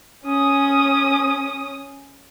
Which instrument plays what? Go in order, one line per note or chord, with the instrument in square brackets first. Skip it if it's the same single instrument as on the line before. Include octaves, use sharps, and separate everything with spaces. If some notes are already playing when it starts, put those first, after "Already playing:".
[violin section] C#4 D#6